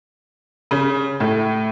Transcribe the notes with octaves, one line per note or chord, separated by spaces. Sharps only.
C#3
A2